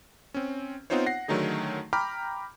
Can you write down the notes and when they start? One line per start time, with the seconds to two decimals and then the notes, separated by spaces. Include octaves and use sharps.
0.34 C4 C#4
0.90 B3 C4 D#4 F4 C5 C#5
1.06 F#5 A#6 C7
1.28 D3 D#3 F#3 A3 D#4 G#4
1.93 G5 A#5 B5 D6 F6 G6